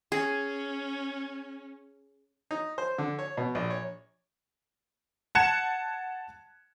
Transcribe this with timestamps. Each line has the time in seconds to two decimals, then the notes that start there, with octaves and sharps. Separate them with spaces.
0.12 C#4 G#4
2.51 D#4
2.78 C5
2.98 D3
3.19 C#5
3.37 B2
3.55 A#1
3.70 C#5
5.35 F#5 A5 F#6 G#6 C#7 E7